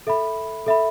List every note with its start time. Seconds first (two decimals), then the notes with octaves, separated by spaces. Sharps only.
0.07 A4 E5 B5
0.66 A4 E5 B5